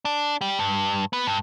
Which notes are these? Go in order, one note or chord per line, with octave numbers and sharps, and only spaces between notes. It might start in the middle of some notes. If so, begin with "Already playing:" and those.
D4
G3
G2
B3
G2